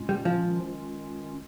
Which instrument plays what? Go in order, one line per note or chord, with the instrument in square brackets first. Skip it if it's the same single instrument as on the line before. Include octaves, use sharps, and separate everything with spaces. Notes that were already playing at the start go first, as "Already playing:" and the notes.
Already playing: [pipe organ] A#2 G#3 C#4 F4
[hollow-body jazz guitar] G3
F3
[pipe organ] D#3 G#3 C#4 F4